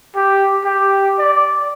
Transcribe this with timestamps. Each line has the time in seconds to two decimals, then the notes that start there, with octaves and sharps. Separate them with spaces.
0.15 G4
0.65 G4
1.19 D5